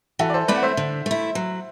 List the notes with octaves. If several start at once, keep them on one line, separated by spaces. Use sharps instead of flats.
E3 F#4 A4
D5
A4 C5
A3 C4 E4 B4 D5
F#5
C5 E5
D3
A3 E4
F#3